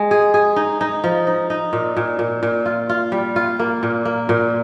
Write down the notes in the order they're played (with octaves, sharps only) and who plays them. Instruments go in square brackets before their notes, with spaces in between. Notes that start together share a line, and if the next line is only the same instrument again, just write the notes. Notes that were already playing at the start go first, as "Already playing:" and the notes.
Already playing: [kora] G#3
G#4
G#4
D#4
D#4
F3
D#4
D#4
A#2
A#2
A#2
A#2
F4
F4
G3
F4
A#3
A#2
A#3
A#2